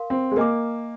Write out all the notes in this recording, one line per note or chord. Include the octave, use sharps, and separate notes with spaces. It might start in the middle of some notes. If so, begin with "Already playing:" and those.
Already playing: A#4 F5 C6
C4
G#3
A#3 A#4 D#5 G#5 D6